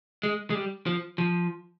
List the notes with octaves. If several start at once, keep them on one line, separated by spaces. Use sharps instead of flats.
G#3
G#3
G3
F3
F3